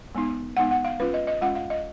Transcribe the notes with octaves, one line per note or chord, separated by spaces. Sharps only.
G#3 B3 D#4
G#3 B3 D#4 F#5
F#5
F5
G#3 C#4 F4 B4
D#5
D#5
G#3 C#4 F4 F#5
F5
D#5